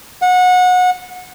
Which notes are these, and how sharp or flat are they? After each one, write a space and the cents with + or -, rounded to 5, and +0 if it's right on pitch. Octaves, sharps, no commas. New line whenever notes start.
F#5 -25